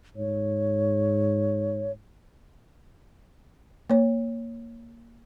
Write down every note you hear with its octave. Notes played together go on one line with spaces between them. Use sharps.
G#2 C#5
A#3 C#5